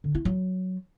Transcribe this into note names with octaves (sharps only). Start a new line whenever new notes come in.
D3
E4
F#3